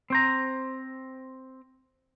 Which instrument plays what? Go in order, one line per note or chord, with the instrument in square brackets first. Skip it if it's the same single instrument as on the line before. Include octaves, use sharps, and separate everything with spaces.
[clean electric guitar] C4 C5 A#5